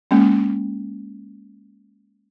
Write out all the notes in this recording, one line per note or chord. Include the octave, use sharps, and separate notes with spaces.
G#3 A#3 C#4